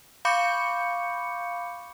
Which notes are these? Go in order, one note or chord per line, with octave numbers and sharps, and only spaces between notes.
F5 B5 C#6 D6 G6 C#7